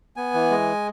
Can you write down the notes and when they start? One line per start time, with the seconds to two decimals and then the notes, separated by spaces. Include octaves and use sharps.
0.16 B3 G#5
0.34 E3
0.51 G#3